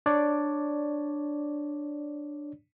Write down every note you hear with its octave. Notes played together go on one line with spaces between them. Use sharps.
D4 C#5 D5